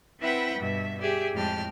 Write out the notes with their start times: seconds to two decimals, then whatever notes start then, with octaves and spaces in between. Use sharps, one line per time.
0.21 C4 E4 B4 E5 F#5 G5
0.58 G2 B2 E5
1.01 G4 G#4 D5 E5
1.34 F2 A2 G#3 G5 A5 F6